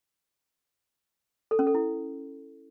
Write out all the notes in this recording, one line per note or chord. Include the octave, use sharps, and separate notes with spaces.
A4
C#4
A4
E4